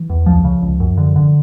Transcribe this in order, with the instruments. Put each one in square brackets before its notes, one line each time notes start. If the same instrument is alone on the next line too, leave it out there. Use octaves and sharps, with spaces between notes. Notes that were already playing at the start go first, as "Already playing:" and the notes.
Already playing: [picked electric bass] E3
E2
C#2 F3
C#3
C#2
F#2
D3
D3